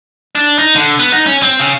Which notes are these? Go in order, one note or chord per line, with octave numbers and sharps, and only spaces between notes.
D4
D#4
D3
B3
D#4
C#4
C4
C#3